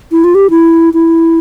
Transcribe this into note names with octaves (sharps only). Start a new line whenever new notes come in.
E4
F4
G4
E4
E4